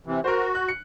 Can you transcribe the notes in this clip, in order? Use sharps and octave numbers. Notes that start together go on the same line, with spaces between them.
C3 E3
F#4 A#4 C5
F#6
C#7